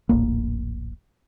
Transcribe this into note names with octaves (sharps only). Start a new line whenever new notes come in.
D#1 A#1 A2 A#3